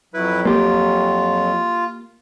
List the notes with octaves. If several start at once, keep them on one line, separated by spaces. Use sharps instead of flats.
F2 F#3 E4 B4
A#3 F4 G4